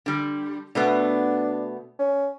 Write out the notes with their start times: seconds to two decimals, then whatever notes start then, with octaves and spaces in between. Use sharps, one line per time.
0.06 D3 G3
0.75 B2 A3 B3 D4
1.99 C#4